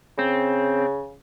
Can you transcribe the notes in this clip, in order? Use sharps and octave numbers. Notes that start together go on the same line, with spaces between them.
C#3 C4